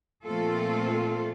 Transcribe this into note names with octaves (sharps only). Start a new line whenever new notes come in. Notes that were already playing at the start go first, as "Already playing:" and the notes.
A#2 F3 A3 C4 F4 A4